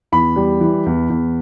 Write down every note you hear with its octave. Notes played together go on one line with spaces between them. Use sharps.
E2 B5
G3
E3
E2
E2